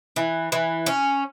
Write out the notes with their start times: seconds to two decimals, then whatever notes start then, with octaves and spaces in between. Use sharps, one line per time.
0.16 E3
0.52 E3
0.86 C#4